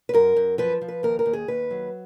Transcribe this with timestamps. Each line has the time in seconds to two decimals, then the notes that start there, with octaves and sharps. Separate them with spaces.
0.09 B4
0.13 F#2 A#4
0.36 F#2
0.58 F3 B4
0.81 F3
0.88 B4
1.03 D#2 A#4
1.19 A#4
1.26 D#2
1.33 G#4
1.48 D#2 B4
1.71 F#3